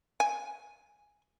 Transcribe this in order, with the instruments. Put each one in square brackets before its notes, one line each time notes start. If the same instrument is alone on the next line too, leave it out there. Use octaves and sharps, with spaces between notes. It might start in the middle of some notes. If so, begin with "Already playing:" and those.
[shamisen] G#5